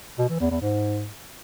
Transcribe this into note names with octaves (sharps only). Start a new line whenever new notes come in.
B2
E3
E2
E2
G#2